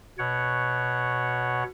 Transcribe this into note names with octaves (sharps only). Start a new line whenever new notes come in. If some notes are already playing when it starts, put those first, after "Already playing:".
B2 C#5 F#5